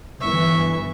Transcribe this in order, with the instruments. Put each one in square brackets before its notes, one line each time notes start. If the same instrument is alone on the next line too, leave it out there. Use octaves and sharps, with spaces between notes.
[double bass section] G1 E3 [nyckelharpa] E5 C#6